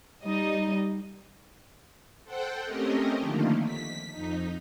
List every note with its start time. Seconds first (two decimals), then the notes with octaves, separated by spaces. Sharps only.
0.24 G3 D#4 D#5
2.24 A4 C5 F#5 G5
2.65 A3 C4 C#4 G4 A#4 D#5
3.18 D3 D#3 F3 A3 A#3
3.64 B6
4.10 F2 D#4